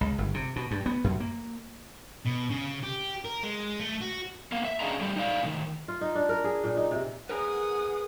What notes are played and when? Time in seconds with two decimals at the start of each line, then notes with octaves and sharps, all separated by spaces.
0.01 C#2
0.18 G1
0.34 C3
0.56 B2
0.71 G2
0.86 B3
1.04 F#2
1.20 A#3
2.25 B2
2.50 C#3
2.83 G4
3.25 A#4
3.43 G#3
3.80 A3
4.01 F#4
4.52 A#3 B3 F5
4.65 E5
4.80 C#4 D4 G#4 D#5 F5 A#5
5.01 G3 A3 G4
5.16 D#4 D5 F5
5.43 A2 C3 D#3
5.88 F4
6.01 D#4
6.15 D4
6.29 A#4
6.44 G#4
6.64 A#2
6.77 D#4
6.91 C3
7.29 G#4 A#4 B4 F#5 D#6